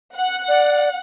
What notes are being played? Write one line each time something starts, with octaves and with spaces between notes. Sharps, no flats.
F#5
D5